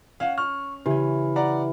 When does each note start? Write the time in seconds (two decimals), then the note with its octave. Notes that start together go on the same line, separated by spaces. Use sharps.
0.20 C#4 F5 F#5 E7
0.38 C#6 F6
0.86 C#3 E3 C#4 G4
1.36 D5 F#5 A#5